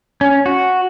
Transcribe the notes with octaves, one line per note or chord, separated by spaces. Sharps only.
C#4
F#4